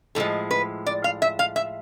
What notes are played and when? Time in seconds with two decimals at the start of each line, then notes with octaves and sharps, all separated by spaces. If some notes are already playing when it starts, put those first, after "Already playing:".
0.15 A2 F3 G#3 A4
0.51 B4
0.86 D5
1.04 F5
1.22 E5
1.39 F5
1.56 E5